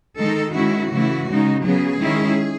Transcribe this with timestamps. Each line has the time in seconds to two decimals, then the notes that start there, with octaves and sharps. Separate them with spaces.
0.18 D#3 G#3 D#4 A4
0.54 D#3 G#3 C#4 E4 F#4
0.90 C#3 E3 A3 E4
1.27 C#3 G#3 D#4
1.63 C#3 F#3 B3 G#4
1.99 D#3 G#3 C#4 E4